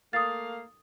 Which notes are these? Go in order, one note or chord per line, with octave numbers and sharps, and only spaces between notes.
A3 A#3 F5 D#6 A6